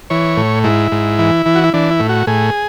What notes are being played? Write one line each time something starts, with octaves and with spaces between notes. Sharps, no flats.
E3 C#5
A2
G#2 E4
G#2
E3
E3
F#4
E4
E3 D4
E4
A2
F#4
A2 G#4